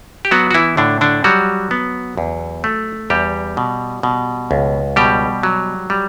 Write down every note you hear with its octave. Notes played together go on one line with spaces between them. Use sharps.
G4
F#3 B3 F#4
F#4
E3 E4
A2 D3 D4
D3 D4
F#3 G3 F#4
B3
E2
A3
E2 G3 G4
B2
B2
C#2
B2 G3 G4
F#3
G3